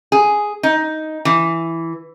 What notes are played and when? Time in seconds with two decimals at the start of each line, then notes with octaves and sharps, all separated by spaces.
0.12 G#4
0.63 D#4
1.25 E3